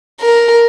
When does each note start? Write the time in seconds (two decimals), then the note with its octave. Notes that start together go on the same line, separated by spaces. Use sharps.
0.21 A#4